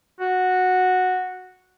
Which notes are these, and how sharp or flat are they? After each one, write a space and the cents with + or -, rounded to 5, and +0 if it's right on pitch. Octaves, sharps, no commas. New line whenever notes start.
F#4 -5